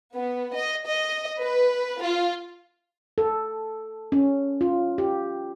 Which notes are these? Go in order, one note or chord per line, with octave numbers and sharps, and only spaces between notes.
B3
D#5
D#5
B4
F4
A4
C#4
F4
G4